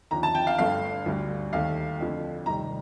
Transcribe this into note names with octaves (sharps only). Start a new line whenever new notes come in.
D#2 D3 F3 A#5
A5
G5
F5
G1 G2 D3 A3 F5
D2 D3 G3
D#2 D#3 A3 F5
F2 D3 A3
F1 D#2 D#3 G3 A#5